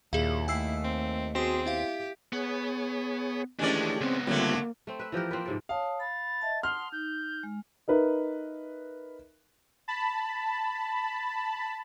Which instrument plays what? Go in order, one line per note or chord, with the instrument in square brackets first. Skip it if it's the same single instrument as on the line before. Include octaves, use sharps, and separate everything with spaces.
[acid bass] D#2 [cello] A#2 [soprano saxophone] E4 [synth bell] G#4 F5
[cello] A3 [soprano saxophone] E4 [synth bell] G#5 E6 C7
[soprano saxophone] C4
[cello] B3 G#4 [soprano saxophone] C4 [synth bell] F#4 C6
[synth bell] E4 E5 F5 [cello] G4
[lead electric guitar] B3 [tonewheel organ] G#4 C#5
[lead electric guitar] D#3 D4 [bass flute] E3 [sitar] G#3 C#4 D5 [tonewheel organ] A3 G4
[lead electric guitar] C#2 B3 [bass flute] C4
[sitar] D3 F#3 A3 [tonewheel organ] G3 C4 F4 [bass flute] A#3
[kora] A3 C4
B4 E5
E3 F3 G4 A#4
A#3 C4 F4 B4
G#2 C3 A4
[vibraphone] C#5 A5 D#6 [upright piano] F5
[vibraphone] B5 [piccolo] A6
[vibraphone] D#5 E5 A5
[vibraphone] F#5 A5 D#6 [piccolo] C6 [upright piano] F6
[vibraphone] D#4 [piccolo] G6
[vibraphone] G#3
[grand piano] D#4 A#4 B4 E5
[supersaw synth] A5 B5